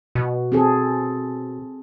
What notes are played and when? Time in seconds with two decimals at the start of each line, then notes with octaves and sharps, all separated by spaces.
0.15 B2 F#4
0.52 C4 G#4 A4